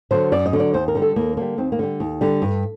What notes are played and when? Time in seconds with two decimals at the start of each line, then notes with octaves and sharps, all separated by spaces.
0.11 D3 F#3 C5
0.32 F#2 D5
0.46 D#5
0.53 D3 F#3
0.60 D5
0.74 D#2 C5
0.88 A#4
0.95 D3 G3
1.02 A4
1.16 D#2 A#3
1.37 D3 G3 A#3
1.58 D#2 C4
1.72 A#3
1.79 D3 G3
2.00 D#2
2.21 D3 G3
2.42 G2